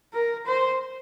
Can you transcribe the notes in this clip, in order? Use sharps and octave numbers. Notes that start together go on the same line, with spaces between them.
A#4
C5